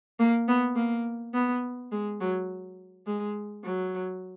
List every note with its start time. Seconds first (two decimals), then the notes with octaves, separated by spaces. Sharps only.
0.19 A#3
0.48 B3
0.76 A#3
1.34 B3
1.92 G#3
2.21 F#3
3.06 G#3
3.64 F#3